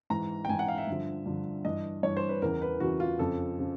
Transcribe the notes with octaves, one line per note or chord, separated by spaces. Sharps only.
G#2 E3 A#5
G5
G#2 E3 G#5
F#5
F5
E5
G2 D3 F3
G2 D3 F3
G2 E3 D#5
G2 E3 C#5
C5
B4
E2 C#3 E3 A#4
B4
E2 C#3 E3 F#4
F4
F2 C#3 F3 A4
C#3 F3